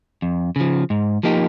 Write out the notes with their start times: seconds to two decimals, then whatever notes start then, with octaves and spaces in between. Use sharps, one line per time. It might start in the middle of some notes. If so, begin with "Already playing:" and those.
0.22 F2
0.56 C#3 F3
0.90 G#2
1.23 F3 A#3 D#4 G4